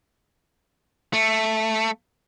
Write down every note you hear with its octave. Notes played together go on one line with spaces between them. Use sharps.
A3